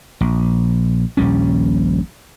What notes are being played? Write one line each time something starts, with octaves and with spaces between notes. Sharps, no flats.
A#1
D#1 A#1 G3 C#4